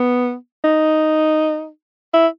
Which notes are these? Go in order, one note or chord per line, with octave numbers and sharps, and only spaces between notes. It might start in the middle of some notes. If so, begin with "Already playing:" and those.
Already playing: B3
D#4
E4